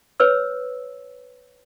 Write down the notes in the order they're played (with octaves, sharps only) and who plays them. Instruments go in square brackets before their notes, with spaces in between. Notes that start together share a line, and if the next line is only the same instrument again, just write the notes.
[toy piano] B4 C#5 E6